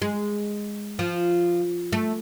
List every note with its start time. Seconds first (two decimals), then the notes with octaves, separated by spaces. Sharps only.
0.02 G#3
0.99 F3
1.93 A3